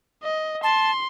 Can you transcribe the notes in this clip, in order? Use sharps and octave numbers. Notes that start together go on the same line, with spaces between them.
D#5
A5 C6